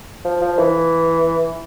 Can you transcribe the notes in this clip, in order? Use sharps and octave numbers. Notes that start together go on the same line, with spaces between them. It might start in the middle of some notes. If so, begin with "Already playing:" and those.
F3
F3
E3